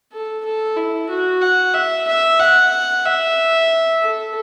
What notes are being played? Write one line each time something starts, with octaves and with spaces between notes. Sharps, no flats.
A4
A4
E4
F#4
F#5
E5
E5
F#5
E5
A4